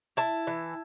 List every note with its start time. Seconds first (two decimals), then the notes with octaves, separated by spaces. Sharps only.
0.17 E4 A5
0.47 E3